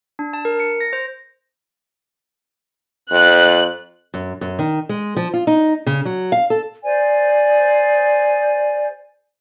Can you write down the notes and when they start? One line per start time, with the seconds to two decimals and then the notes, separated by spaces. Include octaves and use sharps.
0.19 D4
0.33 A5
0.45 A#4
0.60 C#7
0.81 A#6
0.93 C5
3.11 F2 F#6
4.14 F#2
4.41 F#2
4.59 D#3
4.89 G#3
5.16 F3
5.34 F4
5.47 D#4
5.86 C#3
6.05 F#3
6.32 F5
6.50 A4
6.83 G#4 C5 D5 G#5